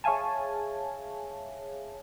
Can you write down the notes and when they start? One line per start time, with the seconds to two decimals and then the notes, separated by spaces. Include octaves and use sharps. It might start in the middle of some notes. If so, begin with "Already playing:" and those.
0.04 G#4 C#5 E5 F5 G#5 A5